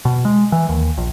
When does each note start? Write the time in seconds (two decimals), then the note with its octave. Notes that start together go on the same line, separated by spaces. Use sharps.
0.05 B2
0.25 G#3
0.52 E3
0.69 D#2
0.98 A#1